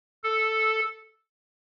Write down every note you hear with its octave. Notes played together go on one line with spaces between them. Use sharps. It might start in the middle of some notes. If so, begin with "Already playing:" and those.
A4